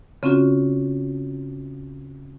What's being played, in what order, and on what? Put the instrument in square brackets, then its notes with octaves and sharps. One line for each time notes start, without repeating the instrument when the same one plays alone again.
[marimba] C#3 C4 C#4 F4 F#4